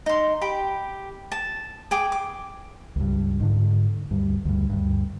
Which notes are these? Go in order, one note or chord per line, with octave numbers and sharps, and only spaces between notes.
D#4 C6
G4 G5 B5
A5
G#4 G5 D6
D6
C#2 G2
G#2 D3
D2 G2
D2 G2
D2 G2